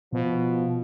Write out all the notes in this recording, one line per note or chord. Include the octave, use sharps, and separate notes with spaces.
B2 F3